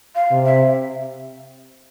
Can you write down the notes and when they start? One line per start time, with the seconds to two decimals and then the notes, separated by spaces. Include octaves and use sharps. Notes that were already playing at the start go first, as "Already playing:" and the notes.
0.15 F5
0.31 C3
0.45 E5